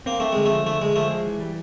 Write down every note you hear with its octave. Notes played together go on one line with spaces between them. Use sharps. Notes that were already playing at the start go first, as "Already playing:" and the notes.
A#3 C4
A3 C4
D3 G#3
A3
F3
D3 A3
D3 G#3
F3 A3
G#3
E3
G3